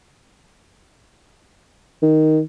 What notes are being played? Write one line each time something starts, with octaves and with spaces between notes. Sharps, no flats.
D#3